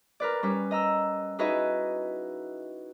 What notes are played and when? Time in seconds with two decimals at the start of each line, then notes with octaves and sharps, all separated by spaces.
0.20 A#4 B4 D5
0.43 G3 C#4 B4
0.71 D#5 A#5 E6
1.39 D#4 E4 F#4 G#4 B4 D#5